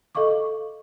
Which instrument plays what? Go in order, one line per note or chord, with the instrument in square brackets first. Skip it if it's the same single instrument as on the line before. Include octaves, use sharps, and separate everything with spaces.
[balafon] A4 D#5 F5 C#6 D6